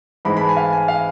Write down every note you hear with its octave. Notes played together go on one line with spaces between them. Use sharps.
G#2 E3 G#3 B5
B5
A5
G#5
F5
G#5
F5